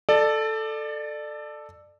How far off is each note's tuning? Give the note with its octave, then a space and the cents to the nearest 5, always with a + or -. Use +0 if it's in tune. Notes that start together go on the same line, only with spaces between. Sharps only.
A4 +0 D5 +25